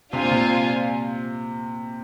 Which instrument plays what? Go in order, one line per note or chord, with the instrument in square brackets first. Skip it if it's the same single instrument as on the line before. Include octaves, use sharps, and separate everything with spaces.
[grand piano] C3 [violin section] D4 F4 C5 F5 G#5
[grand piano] A#2
C3